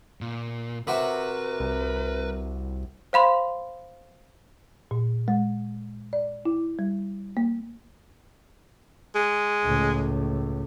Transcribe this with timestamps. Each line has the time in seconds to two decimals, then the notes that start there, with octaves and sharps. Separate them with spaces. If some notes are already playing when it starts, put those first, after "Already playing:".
0.21 A#2
0.87 C3 F#4 A#4 B4
1.60 C2
3.13 C5 F5 B5 C6
4.91 A#2
5.28 G#3
6.13 D5
6.45 E4
6.79 G3
7.37 A#3
9.15 G#3
9.64 C#2 A2